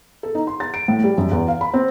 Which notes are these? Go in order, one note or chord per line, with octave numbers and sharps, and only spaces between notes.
A4
D#4
C6
A6
D7
A2
G3
F#2
E2
F5
B5
C4